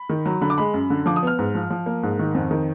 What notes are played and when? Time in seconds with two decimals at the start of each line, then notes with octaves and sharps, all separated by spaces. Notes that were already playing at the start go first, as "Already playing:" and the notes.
Already playing: B5
0.09 D#3
0.26 F#3
0.41 D3 B5
0.50 D6
0.58 G#3 B5
0.74 F#2
0.90 D3
1.06 F3 D6
1.16 D#6
1.23 B3 F6
1.39 G#2
1.55 F3
1.70 F3
1.86 A#3
2.03 G#2
2.19 D#3
2.34 F2
2.51 D#3